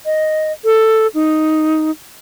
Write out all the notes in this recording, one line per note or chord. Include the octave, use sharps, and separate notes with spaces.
D#5
A4
D#4